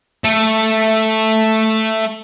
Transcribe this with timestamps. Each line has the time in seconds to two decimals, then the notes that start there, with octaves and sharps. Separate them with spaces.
0.24 A3 A4